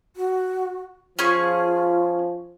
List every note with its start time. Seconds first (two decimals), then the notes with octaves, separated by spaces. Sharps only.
0.16 F#4
1.19 F3 C#4 F4 G#4 C#6